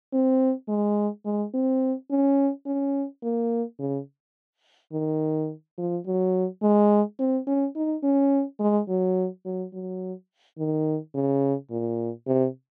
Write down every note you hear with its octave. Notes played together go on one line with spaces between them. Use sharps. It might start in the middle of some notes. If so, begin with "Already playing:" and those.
C4
G#3
G#3
C4
C#4
C#4
A#3
C#3
D#3
F3
F#3
G#3
C4
C#4
D#4
C#4
G#3
F#3
F#3
F#3
D#3
C#3
A#2
C3